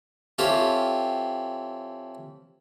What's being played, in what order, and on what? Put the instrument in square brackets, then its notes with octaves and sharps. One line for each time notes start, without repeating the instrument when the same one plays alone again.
[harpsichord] E3 C4 F4 G4 A4 C#5